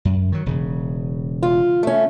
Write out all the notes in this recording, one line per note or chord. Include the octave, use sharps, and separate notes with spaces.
F#2
D#3 F#3
E1 C#3
F4
A3 C#4